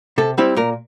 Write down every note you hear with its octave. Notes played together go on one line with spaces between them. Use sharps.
C3 A4
G3 C4 E4
A#2 A#4